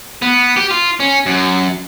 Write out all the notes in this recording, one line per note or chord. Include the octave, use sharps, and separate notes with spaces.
B3
G4
F4
C#4
F#2